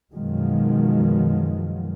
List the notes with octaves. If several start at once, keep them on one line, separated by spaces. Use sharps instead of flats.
F#2 B2 D#3 F3 F#3 G#3